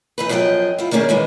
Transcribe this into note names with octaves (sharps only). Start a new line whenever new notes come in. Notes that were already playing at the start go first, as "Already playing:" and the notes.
E3 D#4 B4
F#2 F3 G#4 A#4 D#5 G5
E4 F4
D#3 G3 A#3 C#4 G#4
D#3 E3 G#3